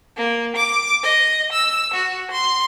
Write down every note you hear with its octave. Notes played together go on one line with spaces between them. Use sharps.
A#3
D6
D#5
E6
F#4
C6